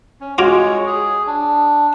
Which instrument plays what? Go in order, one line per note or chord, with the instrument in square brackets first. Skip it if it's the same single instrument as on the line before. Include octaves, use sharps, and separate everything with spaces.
[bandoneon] C#4
[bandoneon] G#3 C#5 [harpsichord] F4 F#4 D6
[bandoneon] G#4
D4